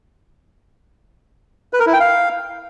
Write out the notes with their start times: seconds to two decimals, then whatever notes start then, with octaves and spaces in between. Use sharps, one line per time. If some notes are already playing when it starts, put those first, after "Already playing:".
1.73 B4
1.80 A#4
1.86 E4
1.93 G5
2.00 F5